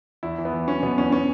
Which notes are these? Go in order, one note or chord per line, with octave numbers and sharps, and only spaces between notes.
E2 E4
E3
B3
E3
F#3 C#4
B2 B3
E2 C#4
C#4